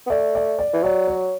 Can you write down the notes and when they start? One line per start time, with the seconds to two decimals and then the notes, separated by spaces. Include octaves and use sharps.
0.06 B3
0.10 A3 D5
0.35 D5
0.59 D5
0.73 E3
0.83 F#3 D5
1.07 C#5